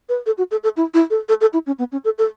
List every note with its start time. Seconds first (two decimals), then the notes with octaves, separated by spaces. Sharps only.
0.09 B4
0.26 A4
0.38 F#4
0.51 A4
0.63 A4
0.77 E4
0.94 E4
1.10 A4
1.29 A4
1.41 A4
1.53 E4
1.67 C#4
1.79 B3
1.92 C#4
2.05 A4
2.18 A4